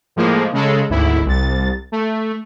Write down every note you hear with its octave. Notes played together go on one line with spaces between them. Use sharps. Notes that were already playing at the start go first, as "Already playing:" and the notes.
A2 F3 G#3 A#3
C#3 G#3 A4
G#1 D2 E4
C2 A6
A3